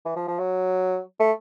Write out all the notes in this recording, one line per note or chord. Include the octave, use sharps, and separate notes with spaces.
E3
F3
F3
F#3
A3